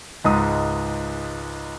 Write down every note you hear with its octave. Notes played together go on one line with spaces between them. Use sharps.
C#2 G#2 D#6